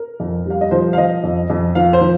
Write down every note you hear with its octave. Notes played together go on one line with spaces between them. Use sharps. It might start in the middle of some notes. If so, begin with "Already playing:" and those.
Already playing: A#4
F2
G3 F5
D#5
F3 C5
F5
F3 D#5
F2
F2
F3 F5
C5
F3